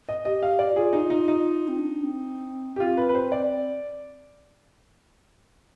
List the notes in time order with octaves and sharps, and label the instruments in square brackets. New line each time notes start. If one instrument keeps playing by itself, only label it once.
[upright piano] D#5
[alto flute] G4 [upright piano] D#5
[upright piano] F5
D5
[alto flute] F4 [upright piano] G#4
[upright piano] D#4
D#4
D#4
[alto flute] C4
D4
C4
[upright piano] G4
[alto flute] C4 [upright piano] F4
[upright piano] B4
B4
C5
D5